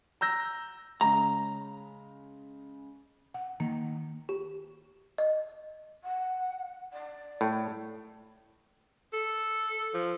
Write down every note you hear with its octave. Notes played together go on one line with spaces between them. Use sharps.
A#5 E6 G6 A#6
C#3 G#3 A#5
F#5
D#3 A#3
G4
D#5
F#5
D5
A2
A4
F3